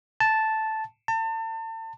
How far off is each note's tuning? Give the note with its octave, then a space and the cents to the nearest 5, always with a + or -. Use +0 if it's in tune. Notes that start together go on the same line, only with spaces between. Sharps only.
A5 -5
A5 +35